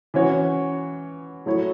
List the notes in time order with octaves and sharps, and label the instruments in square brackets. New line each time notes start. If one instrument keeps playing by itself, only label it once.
[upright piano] E3 C#4 F#4 C#5
F#3 A3 E4 C#5